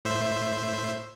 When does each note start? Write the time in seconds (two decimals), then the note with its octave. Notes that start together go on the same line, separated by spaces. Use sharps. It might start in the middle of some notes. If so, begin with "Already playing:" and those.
0.05 A2 C5 E5